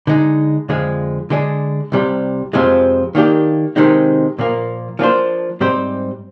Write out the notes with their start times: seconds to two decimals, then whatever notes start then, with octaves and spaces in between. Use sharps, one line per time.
0.07 D3 G#3 D#4
0.69 F2 D3 F3 G#3
1.30 D3 G#3 D4
1.92 C2 C3 G3
2.53 F2 C3 F3 G#3 C4
3.15 D#3 A#3 D4 G4
3.76 C3 D#3 G#3 C4 D#4
4.39 A#2 F3 A#3
4.99 F3 A#3 D4 G4 C5
5.60 G#2 G3 C4 G4 C5